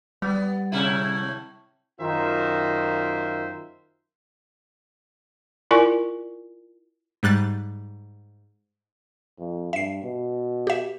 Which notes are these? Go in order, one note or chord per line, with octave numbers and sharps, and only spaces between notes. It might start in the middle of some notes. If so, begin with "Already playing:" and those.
G3 B3
A2 C3 E4
F#2 D#3 F4 A#4 C5 E5
E4 F4 A#4 D5 G#5 C#6
G#2 G3 F#6 A6
F2
G2 E5 C7
B2
G4 E5